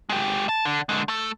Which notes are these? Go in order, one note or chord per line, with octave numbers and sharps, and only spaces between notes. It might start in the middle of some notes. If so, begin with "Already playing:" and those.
G#3 G4
A5
D3
D3 G#3
A3 A4